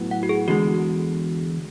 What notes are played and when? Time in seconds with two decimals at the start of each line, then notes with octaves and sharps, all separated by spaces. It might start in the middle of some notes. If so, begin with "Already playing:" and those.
Already playing: A2 F#3 B3
0.11 F#5
0.23 F#4
0.29 G#4
0.48 E2 D3 G#3 F#4